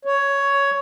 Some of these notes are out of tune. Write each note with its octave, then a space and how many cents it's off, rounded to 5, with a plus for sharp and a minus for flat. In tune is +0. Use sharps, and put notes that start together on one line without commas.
C#5 +10